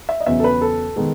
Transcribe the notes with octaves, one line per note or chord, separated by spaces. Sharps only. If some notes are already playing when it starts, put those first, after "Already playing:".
E5
D#5
E2 C#3 F#3 B3 E5
A4
B4
A4
D#3 G#3 B3